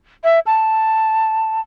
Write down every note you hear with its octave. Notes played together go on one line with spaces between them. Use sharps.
E5
A5